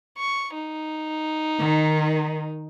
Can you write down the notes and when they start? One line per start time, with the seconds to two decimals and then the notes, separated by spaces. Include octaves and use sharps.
0.18 C#6
0.54 D#4
1.59 D#3